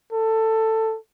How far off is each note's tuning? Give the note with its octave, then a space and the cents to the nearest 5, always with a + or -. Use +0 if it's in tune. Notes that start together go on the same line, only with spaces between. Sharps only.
A4 +15